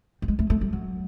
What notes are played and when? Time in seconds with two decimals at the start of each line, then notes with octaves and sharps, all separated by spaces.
0.22 G3
0.28 G#3
0.39 A3
0.50 A3
0.61 G3
0.73 F#3